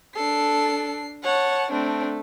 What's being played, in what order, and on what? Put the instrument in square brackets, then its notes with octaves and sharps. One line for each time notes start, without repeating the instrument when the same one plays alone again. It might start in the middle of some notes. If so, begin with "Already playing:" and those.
[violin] D4 C7 [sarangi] A4
[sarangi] C#5 [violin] F#5 A5
[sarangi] A3 [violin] C4 D4